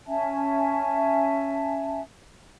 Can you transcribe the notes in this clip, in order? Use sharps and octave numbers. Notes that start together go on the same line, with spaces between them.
C#4 E5 G#5 A5